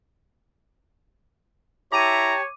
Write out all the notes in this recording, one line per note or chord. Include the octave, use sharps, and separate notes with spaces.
E4 G4 C#5 E5 A5 A#5 D6 D#7